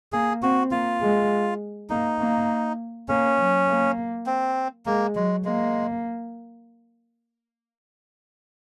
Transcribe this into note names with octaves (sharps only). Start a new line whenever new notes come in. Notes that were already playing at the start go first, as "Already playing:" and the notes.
A#3 G#4
C4 F#4
A#3 F4
G#3
A#3 D#4
A#3
A#3 C#4
F#3
A#3
C4
G#3 A#3
F#3 G#3
G#3 A#3